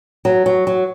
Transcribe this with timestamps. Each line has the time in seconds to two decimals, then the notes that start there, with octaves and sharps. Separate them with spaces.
0.25 F#3
0.46 F#3
0.67 F#3